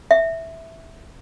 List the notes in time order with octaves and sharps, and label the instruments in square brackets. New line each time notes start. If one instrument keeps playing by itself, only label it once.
[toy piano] E5